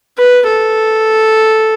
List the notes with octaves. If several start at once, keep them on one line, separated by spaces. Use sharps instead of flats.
B4
A4